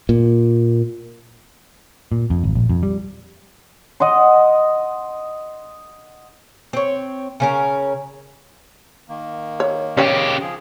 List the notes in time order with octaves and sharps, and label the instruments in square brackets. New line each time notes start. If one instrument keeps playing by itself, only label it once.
[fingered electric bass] A#2
[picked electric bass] A#2
F2
G#1
A#1
F2
G3
[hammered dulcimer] D#5 F#5 C6
[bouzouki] C4 C#5
C#3 C#4 A#4
[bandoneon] D#3 A#3
[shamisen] C#5
[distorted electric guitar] C#3 G4 [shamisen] C#4 C#5 G5
[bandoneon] F3 G#4